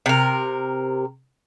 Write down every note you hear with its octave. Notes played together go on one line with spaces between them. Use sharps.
C3 A#4